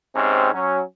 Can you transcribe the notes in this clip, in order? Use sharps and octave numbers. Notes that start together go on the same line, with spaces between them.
G#2 C3 C4 C#4
F#3 C#4